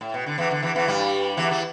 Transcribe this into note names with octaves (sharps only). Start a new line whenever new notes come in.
A2
B2
D3
E2 E3
D3
E2 E3
E2 E3
G2 G3
E2 E3
E3